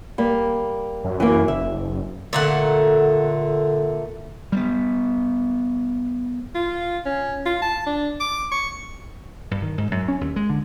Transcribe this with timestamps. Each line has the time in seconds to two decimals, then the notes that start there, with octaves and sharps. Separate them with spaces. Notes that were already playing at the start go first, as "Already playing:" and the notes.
0.18 G3 A#3
1.04 F#2
1.20 E3 A#3
1.48 F#1 E5
2.33 A#2 D3 A3 F#5
4.52 G3 A3 B3
6.55 F4
7.05 C#4
7.46 F4
7.62 A5
7.86 D4
8.20 D6
8.52 C#6
9.51 G2
9.62 D#3
9.78 G#2
9.91 F#2
10.08 C#4
10.21 D#2
10.36 G#3
10.50 D3